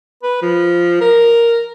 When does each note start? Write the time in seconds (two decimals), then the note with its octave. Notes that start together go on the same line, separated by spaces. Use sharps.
0.23 B4
0.42 F3
1.01 A#4